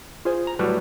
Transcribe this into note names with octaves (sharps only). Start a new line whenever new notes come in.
F4 G#4 C5
A#5
A2 F#3 G3 F#4 B4